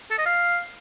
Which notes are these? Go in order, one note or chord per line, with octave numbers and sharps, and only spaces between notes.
A4
D#5
F5